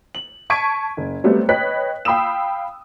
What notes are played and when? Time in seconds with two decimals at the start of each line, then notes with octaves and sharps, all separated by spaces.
0.15 F#7
0.50 A5 C#6 G#6 B6 D7 D#7
0.97 F#1
1.24 F#3 G3 A3 B3 C4
1.49 B4 C#5 D#5 G5 F#6 B6
2.05 F5 G5 B5 D#6 E6 E7